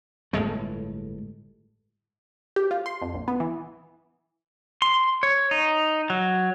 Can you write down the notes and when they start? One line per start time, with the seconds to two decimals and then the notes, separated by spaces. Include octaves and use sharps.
0.33 G1 A2 G#3 A3
2.56 G4
2.71 F4
2.86 C6
3.02 F2
3.14 A#1
3.28 B3
3.40 E3
4.82 C6
5.23 C#5
5.51 D#4
6.10 F#3